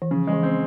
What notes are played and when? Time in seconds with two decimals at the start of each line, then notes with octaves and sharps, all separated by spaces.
0.02 E3
0.11 C#3 F3
0.27 G#3
0.33 E3
0.43 C4